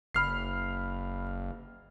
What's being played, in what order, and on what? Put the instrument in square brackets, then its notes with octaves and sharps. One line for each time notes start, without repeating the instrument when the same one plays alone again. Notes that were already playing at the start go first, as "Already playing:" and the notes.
[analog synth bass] F#1 [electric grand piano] B5 F6 C7